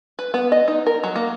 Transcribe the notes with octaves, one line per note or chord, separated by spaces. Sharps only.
B4
B3
D#5
D#4
A#4
F#3
A#3